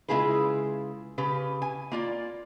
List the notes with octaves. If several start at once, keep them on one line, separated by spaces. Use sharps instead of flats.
C#3 G#3 E4 F4 G#4 B4
C#3 G4 B4
G#5
A#3 F4 D5